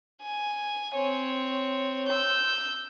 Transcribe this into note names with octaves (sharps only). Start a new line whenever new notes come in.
G#5
C4 C#5
E6 G6